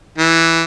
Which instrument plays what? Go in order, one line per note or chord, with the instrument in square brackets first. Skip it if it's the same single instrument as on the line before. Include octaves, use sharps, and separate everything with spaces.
[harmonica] E3